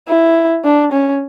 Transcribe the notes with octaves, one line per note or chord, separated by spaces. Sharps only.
E4
D4
C#4